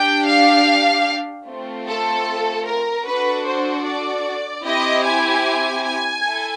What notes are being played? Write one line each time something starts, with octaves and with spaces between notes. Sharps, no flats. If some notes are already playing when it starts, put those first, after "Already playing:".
Already playing: D4 G4 G5
F5
A3 C4 F4
A4
A#4
D4 F#4 A4 B4
C5
D5
C4 E4 G4 D#5
G#5
G#5
E4 A4